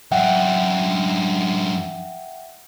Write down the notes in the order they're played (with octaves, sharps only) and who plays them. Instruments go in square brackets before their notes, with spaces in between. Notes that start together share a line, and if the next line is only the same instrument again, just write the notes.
[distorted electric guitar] F#2 D4 [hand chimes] E5 F#5 G5